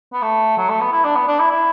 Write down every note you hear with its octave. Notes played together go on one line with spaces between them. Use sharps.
B3
A3
F#3
A3
B3
E4
D4
B3
D4
E4
E4